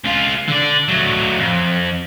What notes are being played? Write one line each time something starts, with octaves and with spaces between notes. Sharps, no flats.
C#2 F4
D3 D5
F#3 A3
F2